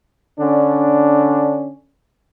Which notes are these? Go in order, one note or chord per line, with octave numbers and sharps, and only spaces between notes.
D3 C#4 D4